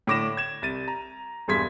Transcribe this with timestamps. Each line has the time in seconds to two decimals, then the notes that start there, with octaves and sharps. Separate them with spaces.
0.07 A2 D3 D6 A#6 E7
0.37 G#6 E7
0.62 C2 A6 D#7
0.88 A#5
1.48 E1 G2 G#4 C6 G#6 B6